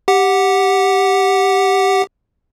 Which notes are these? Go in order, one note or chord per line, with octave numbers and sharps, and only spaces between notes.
G4 F#5